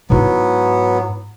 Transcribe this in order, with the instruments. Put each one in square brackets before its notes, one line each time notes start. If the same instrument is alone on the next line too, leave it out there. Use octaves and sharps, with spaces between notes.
[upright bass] G#2 E4 [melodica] F#3 B3